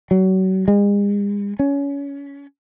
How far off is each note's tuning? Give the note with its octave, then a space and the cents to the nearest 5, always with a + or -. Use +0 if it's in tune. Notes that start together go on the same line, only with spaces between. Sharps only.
F#3 +30
G#3 -40
C#4 +25